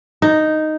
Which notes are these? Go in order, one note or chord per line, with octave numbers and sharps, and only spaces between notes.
D#4